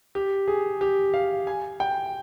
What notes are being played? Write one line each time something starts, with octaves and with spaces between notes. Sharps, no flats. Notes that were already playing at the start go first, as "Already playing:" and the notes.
G4
G#4
G4
F5
G#5
G5